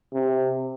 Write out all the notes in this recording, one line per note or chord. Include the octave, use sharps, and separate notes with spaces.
C3